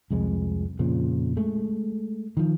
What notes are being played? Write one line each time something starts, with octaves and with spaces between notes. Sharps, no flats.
C2 F2 G#3
F2 A#2 C#3 F3
G#3 A3
D#3 F3